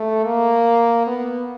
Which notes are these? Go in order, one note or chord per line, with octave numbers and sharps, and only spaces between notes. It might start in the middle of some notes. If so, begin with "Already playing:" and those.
Already playing: A3
A#3
B3